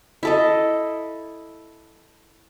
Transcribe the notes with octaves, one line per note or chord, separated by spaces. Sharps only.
E4 A4 D#5